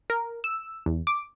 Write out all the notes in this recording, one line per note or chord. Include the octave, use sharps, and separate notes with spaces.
A#4
E6
E2
D6